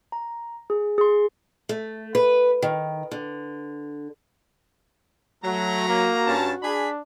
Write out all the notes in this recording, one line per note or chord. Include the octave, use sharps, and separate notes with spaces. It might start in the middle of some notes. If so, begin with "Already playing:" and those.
A#5
G#4
G#4 C6
A3
B4
D#3
D3
F#3 A3 F#4 A#5
A#3
G2 C#4 A5
D4 G#4 B5